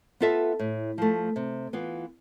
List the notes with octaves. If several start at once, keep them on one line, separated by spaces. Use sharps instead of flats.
B3 F4 A4 E5
A2
F3 A3
C3
E3 B3 F4